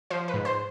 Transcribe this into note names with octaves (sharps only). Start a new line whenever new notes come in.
F3 C5
B4
G#2
C5